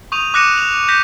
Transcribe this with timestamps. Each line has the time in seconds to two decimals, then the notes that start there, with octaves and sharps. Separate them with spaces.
0.12 C#6 D#6 G6 D#7 F7
0.34 D6 F#6 A#6 C#7 D#7 E7
0.58 F7
0.88 G6 A#6 B6 F7